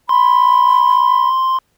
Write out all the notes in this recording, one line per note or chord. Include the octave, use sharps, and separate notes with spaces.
B5 C6